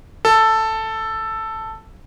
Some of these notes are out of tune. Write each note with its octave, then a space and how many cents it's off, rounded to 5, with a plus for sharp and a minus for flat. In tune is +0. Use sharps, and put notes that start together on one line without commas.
A4 +5